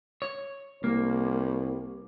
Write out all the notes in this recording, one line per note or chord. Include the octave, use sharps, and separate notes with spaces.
C#5
C2 A#3